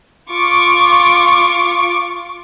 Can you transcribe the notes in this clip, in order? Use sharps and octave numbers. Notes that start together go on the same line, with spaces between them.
F4 C#6 D6